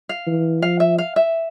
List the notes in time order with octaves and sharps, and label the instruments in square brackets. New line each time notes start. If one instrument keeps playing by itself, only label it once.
[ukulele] F5
[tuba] E3
[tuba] F3 [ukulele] F5
[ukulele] E5
F5
E5